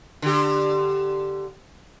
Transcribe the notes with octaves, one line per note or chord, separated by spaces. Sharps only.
D3 G4